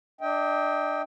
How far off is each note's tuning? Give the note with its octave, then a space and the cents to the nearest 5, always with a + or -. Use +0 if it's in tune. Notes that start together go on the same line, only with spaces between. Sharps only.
D4 +15 D#5 +40 G5 +0